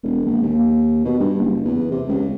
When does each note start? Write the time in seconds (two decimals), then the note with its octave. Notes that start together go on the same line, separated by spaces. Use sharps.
0.03 E1
0.26 A#1
0.42 D#2
1.05 B2
1.20 G2
1.39 F#1
1.65 E2
1.92 C3
2.08 C#2